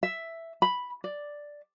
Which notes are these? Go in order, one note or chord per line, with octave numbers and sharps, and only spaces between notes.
E5
B5
D5